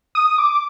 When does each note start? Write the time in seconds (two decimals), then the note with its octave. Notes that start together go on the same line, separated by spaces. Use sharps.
0.15 D#6
0.38 D6